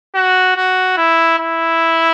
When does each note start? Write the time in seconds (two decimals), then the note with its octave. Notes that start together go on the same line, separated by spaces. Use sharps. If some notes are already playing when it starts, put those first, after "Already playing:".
0.15 F#4
0.57 F#4
0.97 E4
1.39 E4